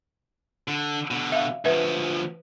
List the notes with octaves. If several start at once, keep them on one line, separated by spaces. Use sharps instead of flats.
D3
B2 D3
E5 F5
D2 F3 B4 E5